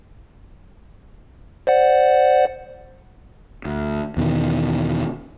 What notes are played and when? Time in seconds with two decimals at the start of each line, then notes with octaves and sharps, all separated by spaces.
1.67 C5 D5 F#5
3.65 D2
4.17 E2 B2 D#3